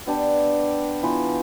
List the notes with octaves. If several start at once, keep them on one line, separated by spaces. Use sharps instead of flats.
B3 D4 G4
E3 B3 F4